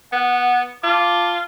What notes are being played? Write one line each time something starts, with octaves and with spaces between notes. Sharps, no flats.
B3 F#5
F4 A5 D6